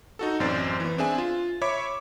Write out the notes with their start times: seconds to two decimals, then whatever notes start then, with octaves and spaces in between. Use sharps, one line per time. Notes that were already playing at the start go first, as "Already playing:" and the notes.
0.19 D#4 F#4 A4
0.40 A1 F#2 C4 C5 D5
0.80 E3 B3
0.98 C4 D4 G#4 E5 G#5
1.18 F4
1.62 C#5 E5 B5 D6